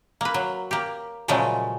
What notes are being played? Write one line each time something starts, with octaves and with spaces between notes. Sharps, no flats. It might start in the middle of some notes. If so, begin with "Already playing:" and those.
A#3 B4
F#3
A#3 G4
A#2 C#3 F3 F#3 G#3 A3